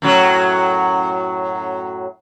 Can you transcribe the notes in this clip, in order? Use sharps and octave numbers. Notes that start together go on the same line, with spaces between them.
F#2 A2 F#3